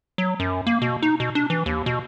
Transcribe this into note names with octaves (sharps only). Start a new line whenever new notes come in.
F#3
F#2
A#3
B2
D#4
B2
D4
E3
D#2
B2